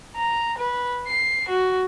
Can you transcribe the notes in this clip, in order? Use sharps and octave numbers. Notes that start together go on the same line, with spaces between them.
A#5
B4
C7
F#4